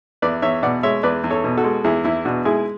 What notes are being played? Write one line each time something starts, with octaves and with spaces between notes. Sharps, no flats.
E2 B4 D5
E2 C#5 E5
B2 D5 F#5
G#3 C#5 E5
E2 B4 D5
E2
A4 C#5
B2
F#4 A4
G#3
E2 E4 G#4
E2 E4
B2 D4 F#4
G#3 E4 G#4